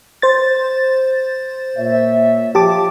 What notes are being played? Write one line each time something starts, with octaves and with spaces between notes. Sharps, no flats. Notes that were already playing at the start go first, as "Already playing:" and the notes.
C5 A6
A#2 C#5 E5
F3 G4 A5 D6